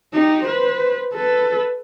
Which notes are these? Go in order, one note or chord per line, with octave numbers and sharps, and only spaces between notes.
D#4 G4
B4 C5
A4 B4